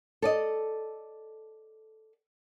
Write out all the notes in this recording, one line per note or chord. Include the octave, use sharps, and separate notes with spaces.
A4 D5 D#5